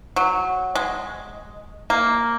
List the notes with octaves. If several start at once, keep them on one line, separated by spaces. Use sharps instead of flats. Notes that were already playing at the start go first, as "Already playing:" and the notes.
F#3
G#3
A#3